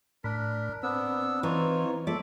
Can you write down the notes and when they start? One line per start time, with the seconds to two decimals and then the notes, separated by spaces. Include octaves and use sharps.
0.24 A2 D4 A#4 B5
0.83 B3 C4 D4 E6
1.43 E3 D#4 F4 C#5
2.07 F3 G#3 B3 A4 D5 E5